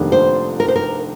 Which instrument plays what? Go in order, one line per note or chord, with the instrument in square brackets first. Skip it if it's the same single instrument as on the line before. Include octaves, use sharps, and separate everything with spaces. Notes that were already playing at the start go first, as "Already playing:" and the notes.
Already playing: [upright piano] F1 F2 D#3 A#3 D4
[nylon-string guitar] C5
A#4
C5
A#4